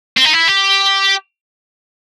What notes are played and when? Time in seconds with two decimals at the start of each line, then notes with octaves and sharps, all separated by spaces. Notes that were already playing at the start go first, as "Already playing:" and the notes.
0.17 C4
0.25 D#4
0.33 E4
0.48 G4